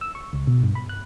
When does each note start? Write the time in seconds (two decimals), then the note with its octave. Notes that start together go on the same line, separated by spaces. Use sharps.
0.01 E6
0.15 C#6
0.33 C#2
0.47 B2
0.63 G2
0.75 B5
0.89 F#6